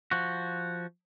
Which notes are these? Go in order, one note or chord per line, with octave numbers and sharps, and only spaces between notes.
F3 F#4